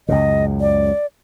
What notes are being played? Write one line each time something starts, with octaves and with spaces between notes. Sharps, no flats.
C#2 F#2 C#3 D#5
D5